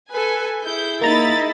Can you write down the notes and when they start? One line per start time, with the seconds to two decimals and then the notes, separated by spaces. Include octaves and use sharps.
0.10 A4 B4 G#5
0.65 E4 G#4 G6
1.01 A#3 D#4 A#5 B5 A6